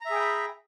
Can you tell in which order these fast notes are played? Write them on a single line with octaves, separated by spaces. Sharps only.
A#5 E5 G#4 G5 B5